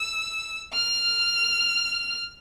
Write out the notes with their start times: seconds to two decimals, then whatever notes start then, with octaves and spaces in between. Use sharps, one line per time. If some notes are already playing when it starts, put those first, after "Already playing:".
Already playing: E6
0.74 F6